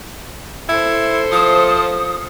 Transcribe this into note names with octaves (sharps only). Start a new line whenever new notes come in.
E4 A4 C5
F3 D#6